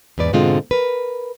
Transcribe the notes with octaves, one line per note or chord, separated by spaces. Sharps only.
E2 G#2 B4 D5
G#2 B2 D3 G#3 C4 F4
A#4 B4